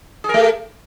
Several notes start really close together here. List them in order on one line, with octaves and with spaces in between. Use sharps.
G#4 A#4 A3